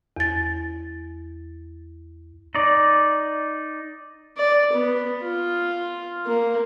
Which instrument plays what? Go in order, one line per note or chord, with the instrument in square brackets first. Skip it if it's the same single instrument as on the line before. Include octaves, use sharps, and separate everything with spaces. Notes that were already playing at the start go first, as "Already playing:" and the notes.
[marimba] E2 A6
[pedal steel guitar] D#4 D5
[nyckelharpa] D5
B3
F4
A#3